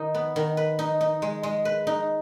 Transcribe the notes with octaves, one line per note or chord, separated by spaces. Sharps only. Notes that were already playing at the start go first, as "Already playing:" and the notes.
Already playing: D#3 D#4
B3
D#3
B4
D#4
D#4
G#3
G#3
B4
D#4